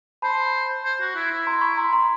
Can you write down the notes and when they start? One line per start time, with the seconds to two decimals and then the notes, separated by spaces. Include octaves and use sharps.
0.22 C5 A5 B5
0.85 C5
1.01 F#4
1.16 E4
1.31 E4
1.47 A#5 C6
1.61 B5 C#6
1.77 A#5 C6
1.93 A#5 C6